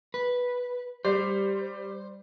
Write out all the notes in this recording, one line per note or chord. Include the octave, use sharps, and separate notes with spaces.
B4
G3 C5